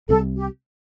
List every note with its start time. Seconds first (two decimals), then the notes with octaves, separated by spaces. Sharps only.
0.09 C2 C3 G3 A4
0.36 G4